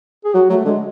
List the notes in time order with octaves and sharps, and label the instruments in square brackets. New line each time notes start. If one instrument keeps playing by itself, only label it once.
[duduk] G#4
[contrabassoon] F#3 [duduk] F#4
[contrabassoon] F#3 [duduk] A3
[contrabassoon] D3 [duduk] G#3